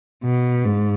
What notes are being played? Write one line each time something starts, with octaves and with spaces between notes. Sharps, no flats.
B2
G#2